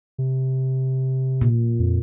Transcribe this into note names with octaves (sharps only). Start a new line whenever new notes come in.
C3
A#2
F2